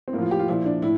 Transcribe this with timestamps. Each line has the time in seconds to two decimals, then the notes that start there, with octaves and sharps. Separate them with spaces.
0.08 C4
0.13 A2 A#3
0.18 F3 F4
0.31 G4
0.39 F4
0.48 A#2 F3 E4
0.65 D4
0.82 A2 E4